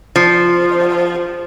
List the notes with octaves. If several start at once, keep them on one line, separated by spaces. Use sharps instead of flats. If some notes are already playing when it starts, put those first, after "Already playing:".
F3